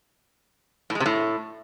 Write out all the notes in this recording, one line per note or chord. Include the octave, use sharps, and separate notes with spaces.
A2
G#3
C3
A2